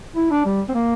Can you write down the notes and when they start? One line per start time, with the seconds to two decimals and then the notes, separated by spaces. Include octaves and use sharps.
0.16 E4
0.31 D4
0.46 G3
0.69 C4
0.75 A#3